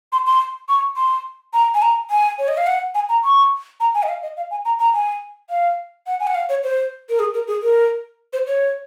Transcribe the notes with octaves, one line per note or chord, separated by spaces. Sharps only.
C6
C6
C#6
C6
A#5
G#5
A#5
G#5
C#5
D#5
F5
F#5
G#5
A#5
C#6
A#5
G#5
D#5
F5
D#5
F5
G#5
A#5
A#5
G#5
F5
F#5
G#5
F#5
F5
C#5
C5
A#4
G#4
A#4
G#4
A#4
C5
C#5